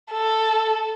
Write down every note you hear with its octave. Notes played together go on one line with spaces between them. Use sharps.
A4